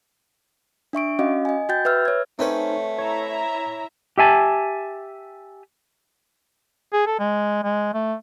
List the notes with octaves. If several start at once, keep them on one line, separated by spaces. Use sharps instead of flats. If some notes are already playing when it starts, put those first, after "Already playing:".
D4 E5 C#6 D7
C#4 F#4 D#5 F5
D#5 G#5
F#4 G5 G6 A6
B4 E5 E6 F6
C#5 G#6
A3 C4 C#4 D#4 B4 C5 A5
E4 C#5 E5 A#5
G4 E5 G#5 A5
G#4
A4
G#3
G#3
A3